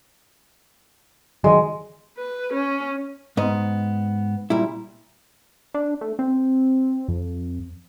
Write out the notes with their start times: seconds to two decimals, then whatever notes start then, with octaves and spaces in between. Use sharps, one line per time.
1.44 D#3 F#3 G#3 D#5
2.19 B4
2.53 C#4
3.37 G#2 B3 D#5
4.50 A#2 G3 E4
5.74 D4
6.01 A3
6.19 C4
7.08 F2